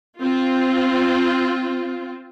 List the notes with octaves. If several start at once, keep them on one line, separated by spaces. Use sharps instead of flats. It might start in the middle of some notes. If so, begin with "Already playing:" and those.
C4 F4